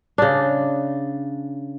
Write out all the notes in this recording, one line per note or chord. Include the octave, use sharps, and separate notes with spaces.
C#3 D4